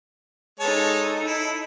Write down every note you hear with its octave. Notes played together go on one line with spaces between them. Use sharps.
G#3 D#4 A4 C#5 A5
E4